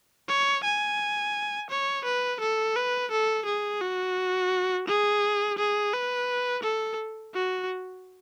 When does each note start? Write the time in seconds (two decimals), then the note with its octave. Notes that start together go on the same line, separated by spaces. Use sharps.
0.28 C#5
0.64 G#5
1.70 C#5
2.04 B4
2.41 A4
2.76 B4
3.11 A4
3.45 G#4
3.81 F#4
4.88 G#4
5.58 G#4
5.93 B4
6.63 A4
7.34 F#4